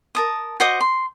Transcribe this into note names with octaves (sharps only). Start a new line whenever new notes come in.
A#4 A5 D#6
F#4 C5 D#5 D6
C6